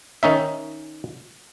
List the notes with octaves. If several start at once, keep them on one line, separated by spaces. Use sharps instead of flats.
D#3 C#4 D#4 E5